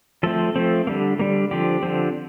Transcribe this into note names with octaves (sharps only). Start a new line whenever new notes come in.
F3 A3 C4 A4
F3 A3 C4
D3 G3 A#3
D3 G3 A#3
D3 F3 C4 G4
D3 F3 C4